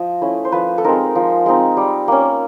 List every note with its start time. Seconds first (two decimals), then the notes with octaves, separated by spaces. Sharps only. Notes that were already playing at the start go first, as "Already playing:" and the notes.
Already playing: F3 D#5
0.21 A3 C#4 E4
0.45 C5
0.52 F3 B4
0.78 A4
0.84 G#3 C4 D#4 A#4
1.15 F3
1.46 G#3 C4 D#4
1.77 G3
2.08 A#3 C#4